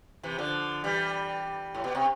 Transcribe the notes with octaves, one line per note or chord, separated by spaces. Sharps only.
C3 E3
D3 F3
E3 G3
A2
B2
C3